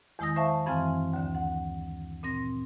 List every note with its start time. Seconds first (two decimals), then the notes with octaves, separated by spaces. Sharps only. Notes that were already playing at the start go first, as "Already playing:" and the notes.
0.19 E2 D#3 G#3 E4 D#6 A#6
0.36 C5 E5 F5 A5 C#6
0.66 F#2 E3 C4 F5 G#5 F6
1.14 D2 D3
1.35 F#5
2.23 A#2 C4 A#6